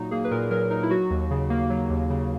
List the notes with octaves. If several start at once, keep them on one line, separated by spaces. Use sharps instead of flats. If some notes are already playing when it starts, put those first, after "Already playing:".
Already playing: A#2 F#3 A#3 D#4 F#4
A#3 G#4
B4
A#2 A#4
F#3 A#4
D#4 A#4
E4
F#3 F#4
D#2
C#3
A#3
F#3
D#2
C#3